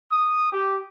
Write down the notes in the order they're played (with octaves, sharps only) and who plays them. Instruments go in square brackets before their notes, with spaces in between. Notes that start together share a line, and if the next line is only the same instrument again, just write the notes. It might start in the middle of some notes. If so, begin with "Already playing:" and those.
[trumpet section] D#6
G4